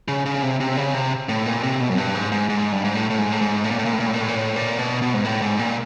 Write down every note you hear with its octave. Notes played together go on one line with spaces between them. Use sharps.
C#3
C#3
C3
C3
C#3
C3
A2
A#2
C3
B2
F#2
G2
G#2
G#2
G#2
G2
G#2
A2
A2
G#2
A2
G#2
A2
A#2
A2
A#2
A2
A#2
A2
A#2
A2
A#2
A2
A#2
B2
B2
G#2
A2
G#2
A#2